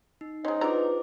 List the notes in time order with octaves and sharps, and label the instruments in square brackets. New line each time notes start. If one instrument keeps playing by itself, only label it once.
[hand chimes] D#4
[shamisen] G#3 C#4 [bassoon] D#4 [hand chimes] C5 C6
[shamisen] F#3 D4 A#5 [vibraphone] F4 B4 [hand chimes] G#4 C5 D6